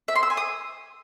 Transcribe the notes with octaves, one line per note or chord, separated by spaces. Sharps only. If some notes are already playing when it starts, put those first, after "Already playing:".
E5
C6
E6
G#5
D#6